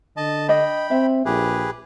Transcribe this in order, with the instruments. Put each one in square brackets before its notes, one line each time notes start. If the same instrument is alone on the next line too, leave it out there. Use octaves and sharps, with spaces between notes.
[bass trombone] D3 [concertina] D#5 A5
[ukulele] D4 D#5 [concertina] G5 B5
[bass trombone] C4 [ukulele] E5
[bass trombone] A#1 [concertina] G4 G#4 B4